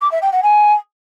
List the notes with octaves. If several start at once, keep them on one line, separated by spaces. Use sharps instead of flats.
D6
E5
G5
F#5
G#5